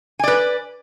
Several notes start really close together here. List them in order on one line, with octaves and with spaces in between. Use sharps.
G#5 D5 B4